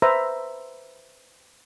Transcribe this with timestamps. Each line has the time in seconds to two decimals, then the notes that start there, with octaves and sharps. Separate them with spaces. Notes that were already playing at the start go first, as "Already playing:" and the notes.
0.02 B4 C5 E5 A#5